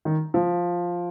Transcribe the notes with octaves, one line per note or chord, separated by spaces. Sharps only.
D#3
F3